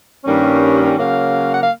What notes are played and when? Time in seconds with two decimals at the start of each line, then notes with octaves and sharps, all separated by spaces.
0.24 G2 D#3 G3 A#3 C#4
0.97 C#3 F#3 A#3 F5
1.52 F#5
1.61 F5